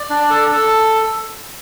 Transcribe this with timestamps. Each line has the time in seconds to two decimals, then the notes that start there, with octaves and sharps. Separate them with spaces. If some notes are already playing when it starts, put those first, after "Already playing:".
Already playing: D5
0.10 D4
0.30 A4
0.51 A4